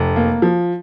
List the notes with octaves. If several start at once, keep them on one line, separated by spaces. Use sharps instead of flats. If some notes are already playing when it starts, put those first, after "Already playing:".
Already playing: F1
A#3
F3